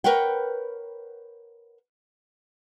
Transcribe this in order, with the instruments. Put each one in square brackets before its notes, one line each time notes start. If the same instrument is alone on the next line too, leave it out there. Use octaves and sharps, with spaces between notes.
[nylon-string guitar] A#4 B4 C#5 F#5 G5